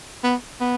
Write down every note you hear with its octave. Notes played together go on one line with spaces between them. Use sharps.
B3
B3